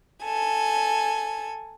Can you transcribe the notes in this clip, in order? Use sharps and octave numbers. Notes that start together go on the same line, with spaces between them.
A4 G#5